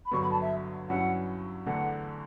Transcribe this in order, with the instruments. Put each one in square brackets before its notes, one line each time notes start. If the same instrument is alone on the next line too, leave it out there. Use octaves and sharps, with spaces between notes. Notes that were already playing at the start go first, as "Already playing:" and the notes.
[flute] B5
[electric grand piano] G2 D3 F#3 B3 [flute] C#6
[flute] B5
A5
E5
[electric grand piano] G2 F#3 C#4 E4 [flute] F#5
[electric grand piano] E2 D3 A3 D4 [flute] F#5